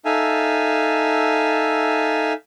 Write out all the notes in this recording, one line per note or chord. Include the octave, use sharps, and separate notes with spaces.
D#4 A4 E5 F5 G#5 A5